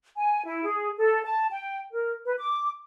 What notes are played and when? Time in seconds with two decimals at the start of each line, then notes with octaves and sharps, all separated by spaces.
0.15 G#5
0.45 E4
0.64 G#4
0.97 A4
1.24 A5
1.51 G5
1.91 A#4
2.24 B4
2.39 D6